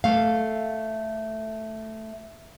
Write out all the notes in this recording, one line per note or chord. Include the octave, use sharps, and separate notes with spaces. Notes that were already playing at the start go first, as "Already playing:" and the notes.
A3 F5